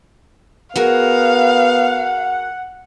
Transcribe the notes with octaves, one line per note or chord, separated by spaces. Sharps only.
B3 F#4 G#4 A#4 F5 F#5